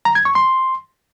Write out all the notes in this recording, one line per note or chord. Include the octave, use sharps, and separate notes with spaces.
A#5
G#6
C#6
C6